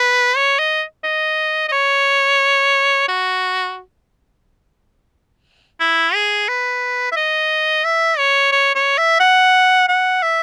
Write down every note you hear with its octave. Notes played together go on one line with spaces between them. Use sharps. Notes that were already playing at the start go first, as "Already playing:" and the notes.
Already playing: B4
C#5
D#5
D#5
D#5
C#5
F#4
E4
G#4
B4
E5
D#5
E5
C#5
C#5
C#5
E5
F#5
F#5
E5